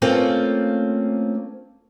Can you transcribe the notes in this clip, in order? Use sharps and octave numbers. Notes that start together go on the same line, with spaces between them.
A3 A#3 C4 C#4 F4